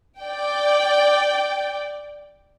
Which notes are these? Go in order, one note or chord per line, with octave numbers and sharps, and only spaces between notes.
D5 G5